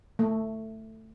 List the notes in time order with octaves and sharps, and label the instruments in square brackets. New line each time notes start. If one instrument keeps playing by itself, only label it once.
[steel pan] A3